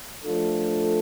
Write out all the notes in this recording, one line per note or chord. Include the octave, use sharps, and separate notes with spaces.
F3 A3 D4 F4 A4